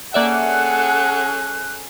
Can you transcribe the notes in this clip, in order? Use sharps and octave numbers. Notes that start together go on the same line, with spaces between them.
A#3 C#4 G#4 A4 D5 E5 F#5 F#6